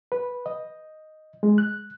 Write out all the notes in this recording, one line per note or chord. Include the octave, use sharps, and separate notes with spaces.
B4
D#5
G#3
F#6